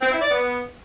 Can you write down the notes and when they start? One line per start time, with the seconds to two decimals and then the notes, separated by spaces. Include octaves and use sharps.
0.01 C4
0.11 E4
0.21 D5
0.31 B3